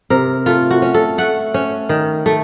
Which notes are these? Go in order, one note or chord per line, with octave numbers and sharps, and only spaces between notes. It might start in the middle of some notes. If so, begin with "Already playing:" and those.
C3 A#4
A3 F4
F#4
C#4
A4
A3 F#5
C#4
D#3
A3